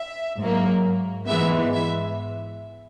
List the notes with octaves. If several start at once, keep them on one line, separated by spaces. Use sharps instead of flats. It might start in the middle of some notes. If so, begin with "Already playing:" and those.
Already playing: E5
G#2 F#3 A#3
G#2 E3 G#3 B3 E5
E5